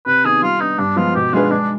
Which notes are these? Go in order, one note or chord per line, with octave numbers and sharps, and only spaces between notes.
C3 B4
D#3 B3 G#4
G3 F4
B3 D4 D#4
G2 D4
F3 G#3 B3 F4
B2 G4
G#3 D4 F4 G#4 B4
G#3 D4